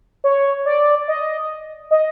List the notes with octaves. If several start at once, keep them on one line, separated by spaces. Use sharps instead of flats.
C#5
D5
D#5
D#5